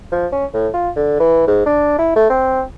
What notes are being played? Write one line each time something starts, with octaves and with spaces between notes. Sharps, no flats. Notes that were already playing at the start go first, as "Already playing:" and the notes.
F3
C#4
A2
F4
D3
E3
G#2
D4
E4
A3
C4